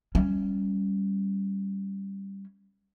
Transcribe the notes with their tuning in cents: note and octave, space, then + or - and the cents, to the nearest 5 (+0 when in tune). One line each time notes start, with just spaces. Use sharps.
G3 +0 C#4 +0